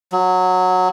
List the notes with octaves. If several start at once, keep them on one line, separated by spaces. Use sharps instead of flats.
F#3